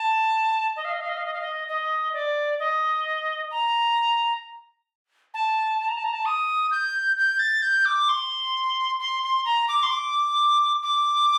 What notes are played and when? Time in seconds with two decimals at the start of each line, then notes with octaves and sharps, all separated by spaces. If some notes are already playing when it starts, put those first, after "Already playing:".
Already playing: A5
0.76 D#5
0.85 F5
0.93 D#5
1.01 F5
1.09 D#5
1.17 F5
1.26 D#5
1.34 F5
1.41 D#5
1.68 D#5
2.13 D5
2.59 D#5
3.51 A#5
5.34 A5
5.80 A5
5.88 A#5
5.97 A5
6.05 A#5
6.13 A5
6.25 D#6
6.71 G6
7.17 G6
7.39 A6
7.62 G6
7.85 D6
8.09 C6
8.99 C6
9.23 C6
9.45 A#5
9.69 D6
9.83 C6
9.91 D6
10.83 D6